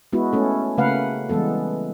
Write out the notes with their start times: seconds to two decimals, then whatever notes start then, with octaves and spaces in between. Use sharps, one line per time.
0.13 G#3 B3 E4 F#4
0.33 A3 C#4 A4
0.78 C#3 A3 A#3 B4 F5 F#5
1.29 E3 G3 G#3 B3 A4